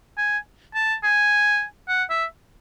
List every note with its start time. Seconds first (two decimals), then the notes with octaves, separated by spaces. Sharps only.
0.18 G#5
0.75 A5
1.04 G#5
1.89 F#5
2.10 E5